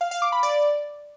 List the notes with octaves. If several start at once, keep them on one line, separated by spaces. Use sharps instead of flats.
F5
F5
D6
B5
D5